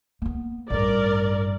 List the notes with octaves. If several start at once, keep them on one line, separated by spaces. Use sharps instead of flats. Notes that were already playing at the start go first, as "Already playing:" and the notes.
A#3 B3
A1 G2 A#4 D5